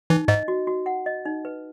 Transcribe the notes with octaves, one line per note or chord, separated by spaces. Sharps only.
E3 D#4
G#2 D#5
F#4
F#4
F#5
D#5
D#4
B4